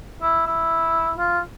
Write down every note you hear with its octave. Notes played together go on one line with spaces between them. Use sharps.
E4
E4
F4